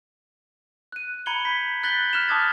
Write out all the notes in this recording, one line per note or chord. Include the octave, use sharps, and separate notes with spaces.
F#6 D#7
A#5 B5 G#6 C#7 F#7 G7
G6 B6
F#6 G6 A6 B6 F#7 G7
F6 F#6 B6 E7 F7
A5 D6 D#6 G#6 A6